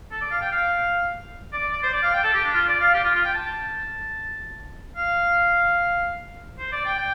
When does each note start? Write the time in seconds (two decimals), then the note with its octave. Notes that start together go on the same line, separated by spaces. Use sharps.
0.11 A4
0.21 D5
0.31 F5
0.41 G5
0.52 F5
1.53 D5
1.72 D5
1.83 C5
1.93 D5
2.03 F5
2.14 G5
2.24 A4
2.34 G4
2.44 D4
2.54 F4
2.68 D5
2.81 F5
2.94 G4
3.04 F4
3.15 F4
3.25 G5
3.35 A5
4.97 F5
6.59 C5
6.72 D5
6.85 G5
6.98 G5